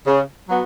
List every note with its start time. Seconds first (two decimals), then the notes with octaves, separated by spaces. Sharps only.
0.07 C#3
0.48 F#3 B3 F#4